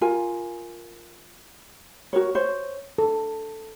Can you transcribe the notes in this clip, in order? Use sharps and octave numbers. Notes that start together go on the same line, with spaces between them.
F4 A#4 G#5
F#4 A#4 C#5
C5 C#5
A4